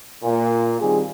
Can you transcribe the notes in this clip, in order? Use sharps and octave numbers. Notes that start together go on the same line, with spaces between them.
A#2
D#3 G3 C4 F4 G#4